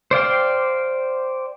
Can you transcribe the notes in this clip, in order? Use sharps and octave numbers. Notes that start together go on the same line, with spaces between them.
C5 D5 F5 G5